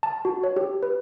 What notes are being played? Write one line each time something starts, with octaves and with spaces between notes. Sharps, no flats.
A5
F#4
C#5
G4
B4